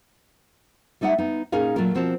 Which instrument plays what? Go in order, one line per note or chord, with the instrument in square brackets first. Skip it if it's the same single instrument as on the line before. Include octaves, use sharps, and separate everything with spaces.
[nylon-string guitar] G3 A3 D#4 E5 F#5
B3 D#4
A#2 C#4 D#4 G#4 A#4 F5
A#2 F#3 A3 F4 A#4
B2 F3 C4 F#4 A#4 A5